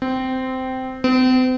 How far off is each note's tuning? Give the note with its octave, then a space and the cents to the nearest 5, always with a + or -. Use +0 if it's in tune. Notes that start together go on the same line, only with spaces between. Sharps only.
C4 -15
C4 -40